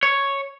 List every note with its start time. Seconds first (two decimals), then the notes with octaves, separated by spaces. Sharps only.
0.03 C#5